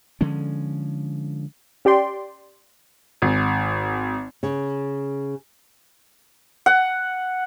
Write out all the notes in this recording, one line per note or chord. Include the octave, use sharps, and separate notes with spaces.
D3 F3 G#3 C#4
C#4 G4 D5 G5 C6
G#1
C#3
F#5